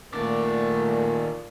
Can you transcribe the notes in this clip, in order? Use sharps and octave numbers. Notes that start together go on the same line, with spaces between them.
A#2 D#3 A3 D5